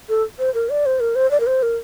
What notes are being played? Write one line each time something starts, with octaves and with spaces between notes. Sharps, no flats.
A4
C5
A#4
D5
C5
A#4
C5
D5
A#4
C5
A#4